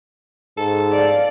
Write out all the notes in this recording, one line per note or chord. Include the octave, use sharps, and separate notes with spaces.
G#2 A4
D5 F5